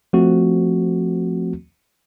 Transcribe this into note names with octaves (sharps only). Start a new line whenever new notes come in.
F3 A3 C4 F#4